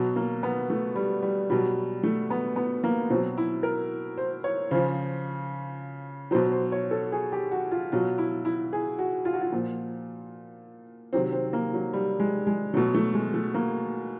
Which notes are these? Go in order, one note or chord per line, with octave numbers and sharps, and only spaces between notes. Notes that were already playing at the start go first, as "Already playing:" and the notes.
Already playing: B2 F#3
A#3
B3
A3
G3
G3
B2 F#3 G3
A3
B3
B3
A#3
B2 F#3 C4
E4
A#4
C5
C#5
C#3 F3 C5
B2 F#3 C5
C5
C#5
A4
G#4
G4
F#4
F4
B2 F#3 F4
E4
E4
G#4
F#4
F4
F#4
F4
A#2 F3
C3 D#3 F#3 C4
C4
A#3
F#3
G3
G#3
G#3
B2 F#3 A3
A3
G#3
A3
A#3